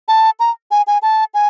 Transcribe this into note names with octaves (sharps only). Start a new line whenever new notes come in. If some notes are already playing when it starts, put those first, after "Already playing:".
A5
A#5
G#5
G#5
A5
G#5